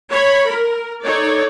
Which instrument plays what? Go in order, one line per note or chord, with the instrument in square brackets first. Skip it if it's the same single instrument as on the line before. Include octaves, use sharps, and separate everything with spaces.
[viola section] C#5 B5
A#4
D#4 A4 C#5 D5